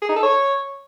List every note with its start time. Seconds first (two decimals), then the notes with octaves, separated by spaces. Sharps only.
0.02 G#4
0.09 D#4
0.16 A4
0.23 C#5